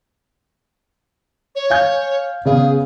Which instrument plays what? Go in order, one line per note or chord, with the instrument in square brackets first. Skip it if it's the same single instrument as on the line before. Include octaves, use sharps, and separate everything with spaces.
[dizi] C#5
[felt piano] F5 G#5 G6
[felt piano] C#3 B3 F5 [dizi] G#4